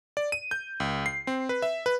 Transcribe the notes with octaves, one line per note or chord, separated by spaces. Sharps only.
D5
D#7
G6
C#2
C7
C4
B4
E5
B4